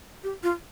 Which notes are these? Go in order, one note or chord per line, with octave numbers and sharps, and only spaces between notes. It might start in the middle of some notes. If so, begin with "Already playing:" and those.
G4
F4